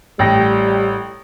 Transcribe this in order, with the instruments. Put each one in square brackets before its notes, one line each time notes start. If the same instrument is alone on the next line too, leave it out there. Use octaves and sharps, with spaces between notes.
[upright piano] A1 G5 A#6 [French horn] G3